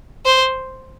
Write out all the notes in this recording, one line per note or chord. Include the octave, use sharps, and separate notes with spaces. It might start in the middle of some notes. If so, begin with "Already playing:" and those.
C5